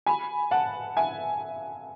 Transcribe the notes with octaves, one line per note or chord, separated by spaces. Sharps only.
G#5 B5
F#5 A5
E5 G#5